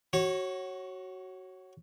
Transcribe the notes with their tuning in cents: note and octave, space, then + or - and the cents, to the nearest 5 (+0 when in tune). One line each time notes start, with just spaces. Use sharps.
F#4 +15 C#5 -20